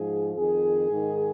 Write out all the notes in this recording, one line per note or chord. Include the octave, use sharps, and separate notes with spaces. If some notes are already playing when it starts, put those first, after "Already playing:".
Already playing: G#2 F3 G#4
F2 D#3 G#4
G#2 D#3